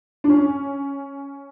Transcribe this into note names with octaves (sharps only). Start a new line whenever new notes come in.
D4
C#4